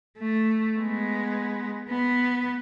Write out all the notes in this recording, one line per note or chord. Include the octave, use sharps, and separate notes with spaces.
A3
G#3 B3
B3